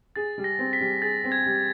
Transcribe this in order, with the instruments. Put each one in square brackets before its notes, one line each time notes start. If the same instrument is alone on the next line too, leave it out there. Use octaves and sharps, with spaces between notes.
[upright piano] G#4 [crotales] A6
[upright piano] G3
[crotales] A#6
[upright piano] C4
[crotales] B6
[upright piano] G3
[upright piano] G#4 [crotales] A6
[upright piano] C4
[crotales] G#6
[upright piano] G3